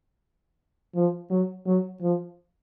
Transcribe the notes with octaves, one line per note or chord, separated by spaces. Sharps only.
F3
F#3
F#3
F3